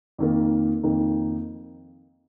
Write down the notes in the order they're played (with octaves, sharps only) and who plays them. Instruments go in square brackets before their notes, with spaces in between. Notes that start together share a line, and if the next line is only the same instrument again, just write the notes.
[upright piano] F2 D#3 A#3
F2 D#3 A#3 D#4